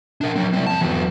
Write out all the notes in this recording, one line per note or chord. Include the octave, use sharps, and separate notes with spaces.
D4 A#4
F#3 C4
G3 C4
F2 A5
E2 F#3